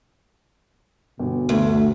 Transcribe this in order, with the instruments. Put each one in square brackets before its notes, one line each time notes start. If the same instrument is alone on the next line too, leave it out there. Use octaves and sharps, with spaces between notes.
[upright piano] G1 [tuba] B2
[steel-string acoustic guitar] D2 [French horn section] A3